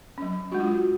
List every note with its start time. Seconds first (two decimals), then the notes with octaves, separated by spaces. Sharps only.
0.18 F#3 C#4
0.52 G#3 D4 F#4
0.60 F4
0.68 F#4